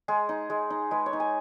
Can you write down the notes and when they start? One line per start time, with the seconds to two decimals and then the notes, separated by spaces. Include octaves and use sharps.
0.08 G#3 G#4
0.29 D#4
0.50 G#3
0.70 D#4
0.91 G#3 B4
1.06 C#5
1.13 D#4
1.20 G#5